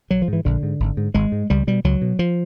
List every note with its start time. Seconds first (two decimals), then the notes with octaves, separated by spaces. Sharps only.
0.10 A#1 F#3
0.22 F3
0.28 G#2 E3
0.45 A#1 D3
0.63 G#2
0.80 G#1
0.97 G#2
1.14 G#1 G#3
1.32 G#2
1.50 C#2 G3
1.67 B2 G3
1.84 C#2 F#3
2.02 B2
2.19 F3